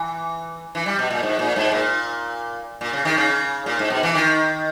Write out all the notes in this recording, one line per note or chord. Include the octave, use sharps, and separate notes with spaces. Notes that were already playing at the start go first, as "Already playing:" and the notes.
Already playing: E3
E3
G3
B2
A#2
G#2
A#2
G#2
A#2
A#2
C#3
D#3
C#3
A#2
G#2
B2
E3
D#3